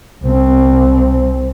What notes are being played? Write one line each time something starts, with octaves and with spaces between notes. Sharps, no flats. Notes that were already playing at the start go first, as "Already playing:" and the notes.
C2 C4